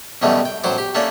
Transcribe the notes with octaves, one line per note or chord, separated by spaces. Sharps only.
F#2 B2 D3 E3 G3 A3
G5
A1 F#3 C5 D6
G4
A3 A#3 C#4 D4 A4